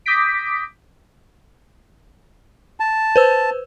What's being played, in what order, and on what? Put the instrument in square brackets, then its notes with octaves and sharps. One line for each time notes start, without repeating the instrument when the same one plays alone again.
[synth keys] D6 D#6 G6 A#6 B6 D7
[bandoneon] A5
[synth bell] B4 C5 E6